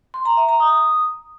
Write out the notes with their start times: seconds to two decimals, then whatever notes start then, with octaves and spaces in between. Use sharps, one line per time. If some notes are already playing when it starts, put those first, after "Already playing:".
0.14 C6
0.25 A#5
0.37 E5
0.49 A#5
0.60 D#6